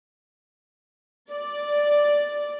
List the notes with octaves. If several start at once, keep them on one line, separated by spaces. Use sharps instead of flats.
D5